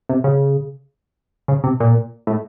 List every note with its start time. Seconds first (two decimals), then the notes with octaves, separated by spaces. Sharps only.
0.09 C3
0.24 C#3
1.48 C#3
1.64 C3
1.80 A#2
2.27 A2